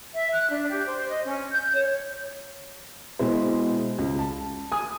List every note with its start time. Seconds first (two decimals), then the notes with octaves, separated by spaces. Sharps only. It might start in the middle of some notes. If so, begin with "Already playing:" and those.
0.14 E5
0.32 F#6
0.50 D4
0.69 G4
0.86 C5
1.08 D#5
1.26 C#4
1.50 G6
1.73 C#5
3.19 B2 G#3 E4 C5
3.98 C#2
4.19 A5
4.72 G#5 D#6